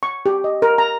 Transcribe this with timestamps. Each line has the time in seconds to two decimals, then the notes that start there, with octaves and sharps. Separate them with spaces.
0.03 C#6
0.26 G4
0.44 D#5
0.62 A#4
0.78 A#5